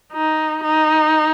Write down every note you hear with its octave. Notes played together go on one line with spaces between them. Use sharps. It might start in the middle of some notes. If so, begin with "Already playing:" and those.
D#4
D#4